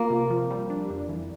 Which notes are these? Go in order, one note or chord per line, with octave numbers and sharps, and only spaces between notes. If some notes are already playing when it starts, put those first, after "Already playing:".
Already playing: A#3 F4
C3
F3
G3
D4
F2
E3